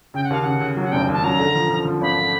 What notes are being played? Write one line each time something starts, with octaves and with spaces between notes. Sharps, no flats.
C#3 G5
F#5
D#2 F5
C#3 F#5
C#3
F#3
F#5
F1 G5
D#2 A5
F#3 A#5
D3
F3
F3
F3
G#1 B5